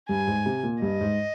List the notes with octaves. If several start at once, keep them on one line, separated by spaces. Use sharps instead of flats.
G2 G#5
G#2
C3
A#2
G2 D#5
G#2